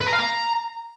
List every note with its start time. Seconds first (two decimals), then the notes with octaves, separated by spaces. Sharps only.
0.01 B4
0.07 A#5
0.13 F5
0.19 A#5